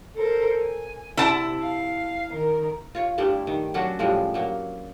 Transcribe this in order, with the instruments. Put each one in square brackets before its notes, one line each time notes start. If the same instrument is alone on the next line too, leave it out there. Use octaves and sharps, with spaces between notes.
[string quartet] A4 A#4 C5
G#5
[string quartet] C3 [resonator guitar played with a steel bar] E4 A5
[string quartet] F5
D#3 A#4
[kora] F4 C#5
G2 G3 A3 E4
D#3
F#3 C#4 D4 F#4
A2 F3 G3 G#3
F#3 A#3